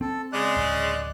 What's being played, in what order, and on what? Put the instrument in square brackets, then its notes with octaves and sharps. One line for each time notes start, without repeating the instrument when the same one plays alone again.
[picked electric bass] C4 [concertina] A4
[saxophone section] C#3 G#3 [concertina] D5 F#6
[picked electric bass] D1